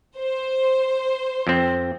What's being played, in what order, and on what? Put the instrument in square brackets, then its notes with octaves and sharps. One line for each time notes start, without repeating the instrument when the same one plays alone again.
[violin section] C5
[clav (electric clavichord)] F2 C4